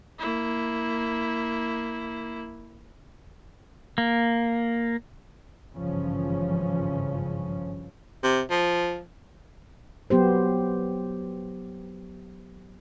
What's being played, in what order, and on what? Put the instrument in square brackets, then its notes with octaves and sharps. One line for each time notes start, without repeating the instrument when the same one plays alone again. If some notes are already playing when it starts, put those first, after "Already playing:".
[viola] A#3 E4
[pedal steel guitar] A#3
[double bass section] G#1 G2 C#3 E3 F3 C#4
[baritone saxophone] C3
F3
[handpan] F#3 B3 G4 C5